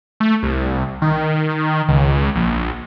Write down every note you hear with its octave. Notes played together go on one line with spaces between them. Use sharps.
A3
C2
D#3
C#2
A#1